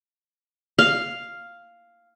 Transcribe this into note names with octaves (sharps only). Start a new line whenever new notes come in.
F5